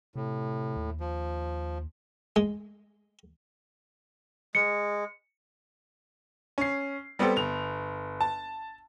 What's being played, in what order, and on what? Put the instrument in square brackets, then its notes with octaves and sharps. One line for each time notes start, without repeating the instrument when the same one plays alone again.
[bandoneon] A2 [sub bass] C3
[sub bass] D#2
[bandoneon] F3
[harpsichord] G#3
[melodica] G#3 [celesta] C#7
[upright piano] C#4 C7
G3 B3 C4 G4 A4
G1 F7
A5